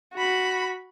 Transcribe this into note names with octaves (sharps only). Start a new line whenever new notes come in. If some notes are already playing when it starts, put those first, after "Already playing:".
F#4 B5